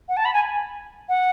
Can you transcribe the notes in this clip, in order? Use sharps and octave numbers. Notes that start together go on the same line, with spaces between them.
F#5
A5
B5
G#5
F#5